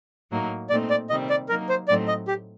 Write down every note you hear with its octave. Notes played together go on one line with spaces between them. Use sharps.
A2 F#3 A#3 D#4
A#2 A3 C4 D#4 D5
D5
C3 D#3 G3 C4 D#5
D5
F#3 A#3 D#4 A#4
C5
A2 F#3 A3 C4 D#4 D5
D#5
G4